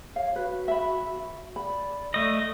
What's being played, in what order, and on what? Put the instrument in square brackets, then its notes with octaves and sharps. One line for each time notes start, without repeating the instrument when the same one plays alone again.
[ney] C#5 [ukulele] F5
[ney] F#4 [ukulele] B4
[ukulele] E5 B5
[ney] D5 [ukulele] B5
[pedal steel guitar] A3 D#5